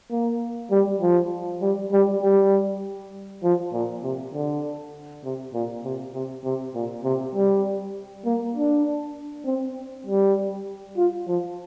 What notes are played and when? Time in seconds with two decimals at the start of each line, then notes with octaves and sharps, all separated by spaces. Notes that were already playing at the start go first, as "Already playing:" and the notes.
0.11 A#3
0.71 G3
1.01 F3
1.61 G3
1.92 G3
2.22 G3
3.43 F3
3.72 A#2
4.03 C3
4.34 D3
5.24 C3
5.53 A#2
5.84 C3
6.14 C3
6.44 C3
6.74 A#2
7.04 C3
7.35 G3
8.25 A#3
8.56 D4
9.45 C4
10.06 G3
10.97 F4
11.27 F3